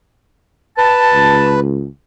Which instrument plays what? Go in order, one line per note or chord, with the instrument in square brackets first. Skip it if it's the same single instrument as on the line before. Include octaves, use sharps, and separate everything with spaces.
[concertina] B4 [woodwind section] A5
[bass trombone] C#2